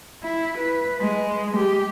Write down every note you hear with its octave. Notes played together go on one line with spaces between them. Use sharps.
E4
B4
G#3
G4